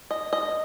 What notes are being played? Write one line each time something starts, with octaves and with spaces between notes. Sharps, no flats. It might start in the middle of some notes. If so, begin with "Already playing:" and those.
D#5
D#5